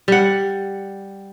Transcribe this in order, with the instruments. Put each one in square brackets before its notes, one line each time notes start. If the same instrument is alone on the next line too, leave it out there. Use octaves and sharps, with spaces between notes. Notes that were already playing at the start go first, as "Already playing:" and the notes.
[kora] G3 F#5